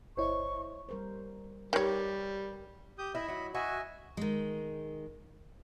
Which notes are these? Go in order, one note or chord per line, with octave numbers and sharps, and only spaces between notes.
G1 E4 C5 C#5 D#5 C#6
G3 A#4 C5
D#3 G3 G4 A#4 B4 C#5
G4 D#6 G6
E4 D#5 B5
F#3 E4
F#4 D#5 E5 G#5
D#3 G#3